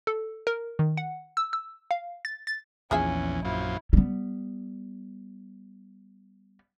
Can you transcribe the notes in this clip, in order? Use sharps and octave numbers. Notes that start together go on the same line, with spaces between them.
A4
A#4
D#3
F#5
E6
E6
F5
A6
A6
A#1 E2 C#4 F4 G#4 E5
F#2 F3 E4
G3 B3